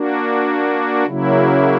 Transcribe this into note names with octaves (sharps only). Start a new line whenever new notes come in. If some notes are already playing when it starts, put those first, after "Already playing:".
Already playing: A#3 D4 F#4
C#3 F#3 A#3 E4